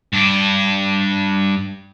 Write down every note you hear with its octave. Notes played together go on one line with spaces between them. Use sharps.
G2 D4